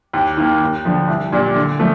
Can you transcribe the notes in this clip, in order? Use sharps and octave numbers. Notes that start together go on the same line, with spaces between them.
D#2
D#3 A#3
D#2
D3 F3
C2
A#2 G3 D4
D3
F3 A3